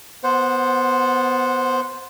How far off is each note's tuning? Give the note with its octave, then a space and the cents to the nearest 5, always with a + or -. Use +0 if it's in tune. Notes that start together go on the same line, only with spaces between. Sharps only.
B3 +10 C5 +0 F#5 -15